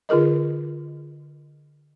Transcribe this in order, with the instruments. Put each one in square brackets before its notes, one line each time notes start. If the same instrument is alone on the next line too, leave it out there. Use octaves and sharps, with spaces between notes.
[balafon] D3 F4 G#4 A#4 D#5